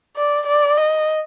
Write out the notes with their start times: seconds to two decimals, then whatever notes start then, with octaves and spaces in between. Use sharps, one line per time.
0.17 D5
0.47 D5
0.78 D#5